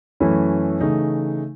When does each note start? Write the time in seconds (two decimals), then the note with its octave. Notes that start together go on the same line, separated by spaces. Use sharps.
0.20 F#2 E3 A3 C#4 E4
0.81 C#3 E3 A3 D#4